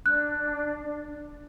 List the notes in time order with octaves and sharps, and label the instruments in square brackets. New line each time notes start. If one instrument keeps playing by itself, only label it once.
[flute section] D4 [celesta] F#6